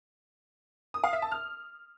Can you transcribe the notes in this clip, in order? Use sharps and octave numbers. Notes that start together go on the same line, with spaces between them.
D#6
F5
E5
A5
F6